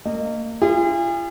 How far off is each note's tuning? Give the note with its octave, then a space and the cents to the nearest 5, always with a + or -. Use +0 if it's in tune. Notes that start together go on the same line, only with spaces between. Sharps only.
A#3 -30 D#5 -15
F4 -40 G#4 -40